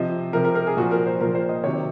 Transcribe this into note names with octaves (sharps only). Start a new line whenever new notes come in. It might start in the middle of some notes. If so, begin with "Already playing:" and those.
Already playing: C3 F3 D#5
C3 F3 A#4
A#4
A#4
G#4
A#2 F3 F#4
A#4
C5
A#2 F3 A#4
C5
D#5
C3 D#3 F#3 C#5